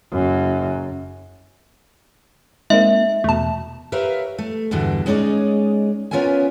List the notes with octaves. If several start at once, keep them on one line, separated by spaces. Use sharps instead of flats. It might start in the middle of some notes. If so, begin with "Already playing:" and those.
F#1 F#2
G#3 A#3 C4 D#4 E5
E2 B2 A3 A5
G4 A#4 B4 C#5 E5 F5
A3
E2 G2 B2 D3 E3
G#3 C#4 D#4 G#4 D5
B3 C#4 F4 A#4 E5 G#5